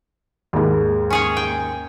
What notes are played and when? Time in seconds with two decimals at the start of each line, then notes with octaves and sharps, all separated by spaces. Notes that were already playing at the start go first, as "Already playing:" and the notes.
0.53 D#2 G#2
1.10 C#4 G#4 C#5
1.37 G5